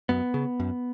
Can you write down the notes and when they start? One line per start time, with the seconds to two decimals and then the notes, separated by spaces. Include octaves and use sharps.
0.09 F#2 B3
0.34 C#3
0.60 F#2